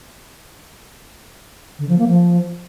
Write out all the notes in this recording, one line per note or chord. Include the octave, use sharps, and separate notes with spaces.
D3
F3
A#3
F3